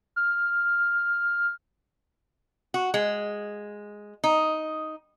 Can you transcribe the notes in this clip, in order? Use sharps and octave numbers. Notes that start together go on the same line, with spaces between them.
F6
F#4
G#3
D#4